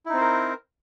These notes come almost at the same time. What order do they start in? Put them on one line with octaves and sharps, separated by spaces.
E4 D#4 C4 C5 A#4